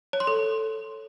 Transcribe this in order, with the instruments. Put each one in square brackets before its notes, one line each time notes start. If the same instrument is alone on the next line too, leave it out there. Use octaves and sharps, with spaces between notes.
[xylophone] C#5
C6
A4